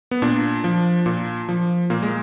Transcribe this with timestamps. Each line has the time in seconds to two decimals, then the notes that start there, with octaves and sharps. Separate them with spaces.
0.11 B3
0.22 A#2 D4
0.64 F3
1.06 A#2
1.49 F3
1.90 A#2 A#3
2.03 G#3